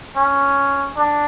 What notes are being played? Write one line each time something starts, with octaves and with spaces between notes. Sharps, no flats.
C#4
D4